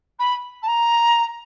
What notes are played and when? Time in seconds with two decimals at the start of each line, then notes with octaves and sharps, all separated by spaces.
0.19 B5
0.62 A5
0.67 A#5